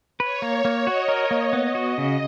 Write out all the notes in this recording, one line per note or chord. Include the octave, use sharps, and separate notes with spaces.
B4 C#5
A#3
A#3
F#4 D#5
A#4
A#3
B3 D#5
F#4
C#3